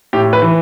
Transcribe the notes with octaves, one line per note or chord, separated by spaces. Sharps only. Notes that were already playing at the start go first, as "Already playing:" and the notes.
A2 G4
B4
E3